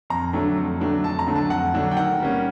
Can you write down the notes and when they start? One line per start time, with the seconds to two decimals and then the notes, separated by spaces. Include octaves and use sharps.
0.10 F2 A#5
0.33 D3 F#3 A3 D4
0.58 F2
0.80 D3 F#3 A3 D4
1.03 F2 A5
1.19 A#5
1.27 D3 F#3 A3 D4
1.36 A5
1.50 F2 F#5
1.74 D3 F#3 A3 D4
1.91 G5
1.97 D#3 F#5
2.20 G3 A#3 C#4